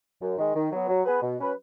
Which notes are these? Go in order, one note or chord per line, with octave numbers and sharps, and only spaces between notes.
F#2
D#3 G#3
D#3
F#3 B3
F#3
B3 G#4 B4
B2
F#3 C#4 B4